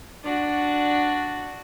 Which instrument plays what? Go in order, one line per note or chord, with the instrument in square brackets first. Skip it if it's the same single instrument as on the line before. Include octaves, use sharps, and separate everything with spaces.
[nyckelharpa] D4 F#4